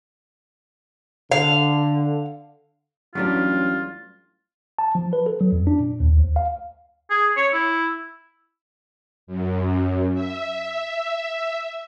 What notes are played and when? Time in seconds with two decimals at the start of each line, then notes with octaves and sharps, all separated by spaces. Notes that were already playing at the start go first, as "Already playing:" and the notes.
1.32 D3 F5
3.15 A1 F#3 G3 D4 F4
4.79 A5
4.95 F3
5.13 B4
5.26 A4
5.41 F#3
5.52 F2
5.67 D4
5.80 A#2
6.00 D#2
6.17 D2
6.36 F5
7.10 G#4
7.37 C#5
7.53 E4
9.27 F#2
10.14 E5